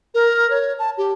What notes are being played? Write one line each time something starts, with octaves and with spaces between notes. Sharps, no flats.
A#4
C#5
A5
G4